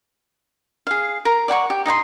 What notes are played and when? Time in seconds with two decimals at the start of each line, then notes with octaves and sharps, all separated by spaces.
0.87 G#4 F5
1.25 A#4 A#5
1.48 D5 F#5 G5 C#6
1.70 G4
1.86 D#4 D#5 G5 C6